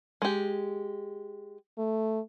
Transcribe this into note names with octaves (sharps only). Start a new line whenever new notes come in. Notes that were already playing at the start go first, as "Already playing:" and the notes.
G#3 G4
A3